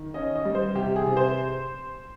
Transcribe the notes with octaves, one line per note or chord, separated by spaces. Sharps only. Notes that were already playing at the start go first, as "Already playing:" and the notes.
Already playing: D#3
C#4 D#5
D#5
G3
C5
C3 G4
G#4
C3
C5